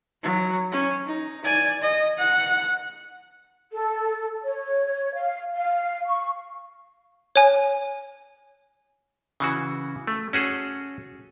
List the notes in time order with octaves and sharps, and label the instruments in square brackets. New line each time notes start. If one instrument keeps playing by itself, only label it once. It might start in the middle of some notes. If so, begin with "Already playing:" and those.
[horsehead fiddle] F#3
C#4
D#4
D5 G#5
D#5
F#5
[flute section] A4
C#5
F5
F5
C#6
[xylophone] C#5 G#5
[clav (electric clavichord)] C#3 E3 F#4
A3
C#4 F#4 G#4 A4